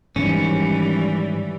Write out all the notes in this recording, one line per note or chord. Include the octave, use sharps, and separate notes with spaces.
G#2 D#3 E3 G3 C#4